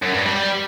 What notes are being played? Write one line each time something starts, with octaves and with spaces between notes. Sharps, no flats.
F#2
G2
G3